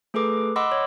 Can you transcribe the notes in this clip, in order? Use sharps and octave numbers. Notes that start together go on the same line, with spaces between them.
A3 G#4 A4 B4 D6
D#5 F#5 B5 C6 D6 E6
C#5